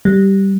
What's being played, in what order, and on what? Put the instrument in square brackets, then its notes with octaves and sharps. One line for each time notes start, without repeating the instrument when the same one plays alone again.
[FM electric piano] G3